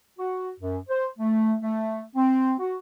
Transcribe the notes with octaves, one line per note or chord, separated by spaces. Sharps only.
F#4
F#2
C5
A3
A3
C4
F#4